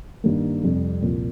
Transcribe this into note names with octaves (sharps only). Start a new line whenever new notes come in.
G2 D#3 G3 A#3
F2 C3 G3
C2 A#2 F3